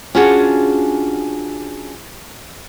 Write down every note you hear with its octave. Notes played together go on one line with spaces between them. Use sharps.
C#4 D4 F4 F#4 G#4 F#5